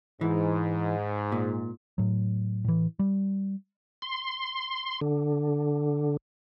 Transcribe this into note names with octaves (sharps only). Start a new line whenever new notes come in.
G#2 E3
A#2
A2 F#3
A2 E3
G3
C6
D3